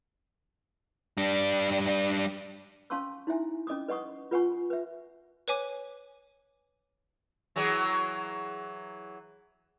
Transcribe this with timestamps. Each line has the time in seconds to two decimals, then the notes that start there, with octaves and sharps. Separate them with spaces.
1.17 G3 D4
2.90 C#4 F5 A5 C6 C#6 E6
3.27 D#4 E4 E5 G#5
3.67 C#4 D#5 D6 D#6
3.88 B4 D#5 F#5 C#6 D#6
4.31 F4 B4 F#5 G#5 C#6
4.70 B4 E5
5.48 B4 C#5 G#5 D6
7.56 E3 F#3 G#4